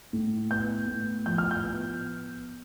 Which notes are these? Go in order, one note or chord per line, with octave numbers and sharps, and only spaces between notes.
A2
B3 G6
A2
F3 G6
F6
G6
B3